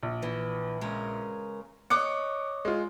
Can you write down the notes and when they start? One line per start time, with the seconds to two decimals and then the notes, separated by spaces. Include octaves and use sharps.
0.03 A#1
0.22 E3
0.81 C#3 G#3 A#4
1.90 C#5 D#5 D6 F#6 C#7
2.65 G#3 F4